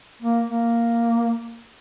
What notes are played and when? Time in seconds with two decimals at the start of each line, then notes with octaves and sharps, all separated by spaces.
0.22 A#3
0.47 A#3